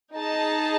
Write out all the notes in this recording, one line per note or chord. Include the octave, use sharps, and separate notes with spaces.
D#4 G#4 D#5 A5